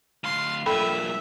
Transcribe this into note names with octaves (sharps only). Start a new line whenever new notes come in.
D2 F5 C6
G2 A#2 A4 E5 G5 B5